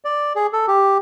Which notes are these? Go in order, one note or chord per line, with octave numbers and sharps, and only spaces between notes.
D5
G#4
A4
G4